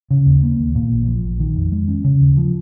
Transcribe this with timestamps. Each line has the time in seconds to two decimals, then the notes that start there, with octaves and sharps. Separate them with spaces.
0.11 C#3
0.26 D#2
0.43 A#3
0.59 D#2
0.75 A#2
0.91 A#1
1.07 F3
1.23 A#1
1.40 D#3
1.56 F2
1.72 G#3
1.88 C#4
2.04 C#3
2.21 D#2
2.37 F3